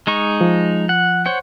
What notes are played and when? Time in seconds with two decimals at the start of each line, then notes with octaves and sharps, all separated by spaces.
0.07 G#3 D#4 C#6
0.41 F3
0.89 F#5
1.26 C5 C#5 F#5